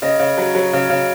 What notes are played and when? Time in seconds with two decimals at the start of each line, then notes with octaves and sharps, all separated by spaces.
0.02 C#3 D#5
0.19 C#3
0.38 F#3
0.55 F#3
0.73 C#3
0.90 C#3